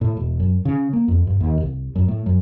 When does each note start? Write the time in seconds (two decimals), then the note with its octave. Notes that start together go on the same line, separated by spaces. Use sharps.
0.01 A2
0.17 E1
0.40 F#2
0.65 C#3
0.93 A#3
1.08 F2
1.27 G2
1.41 D#2
1.63 C2
1.96 F#2
2.08 A2
2.26 F#2